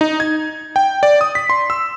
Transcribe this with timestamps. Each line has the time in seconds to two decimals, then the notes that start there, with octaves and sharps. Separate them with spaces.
0.01 D#4
0.20 G#6
0.76 G5
1.03 D5
1.21 D#6
1.35 B6
1.50 C6
1.70 E6